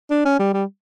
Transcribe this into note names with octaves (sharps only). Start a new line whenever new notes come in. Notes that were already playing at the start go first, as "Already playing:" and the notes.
D4
C#4
G3
G3